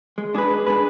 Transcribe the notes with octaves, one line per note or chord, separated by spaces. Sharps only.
G#3
D4 G#4 B4
G#3
D4 G#4 B4